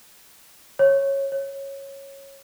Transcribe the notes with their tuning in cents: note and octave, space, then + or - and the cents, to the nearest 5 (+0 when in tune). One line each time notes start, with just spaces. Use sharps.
C#5 -15
C#5 -10